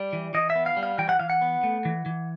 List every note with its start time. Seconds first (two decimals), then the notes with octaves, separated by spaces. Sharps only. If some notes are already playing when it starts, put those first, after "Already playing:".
Already playing: G3 D5
0.13 E3
0.34 E3 D#5
0.50 E5
0.55 B3
0.66 F5
0.77 G3
0.83 F5
0.98 E3 G5
1.09 F#5
1.20 E3 F5
1.30 F#5
1.41 B3
1.64 A3
1.85 E3
2.06 E3